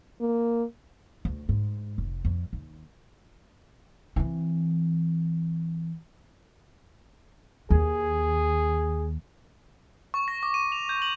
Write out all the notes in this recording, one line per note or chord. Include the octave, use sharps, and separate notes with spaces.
A#3
D2
G#2
F1
F2
D#2
E3 C4
D#2 G#4
C#6
A#6
D6
D#7
F7
G6
F#7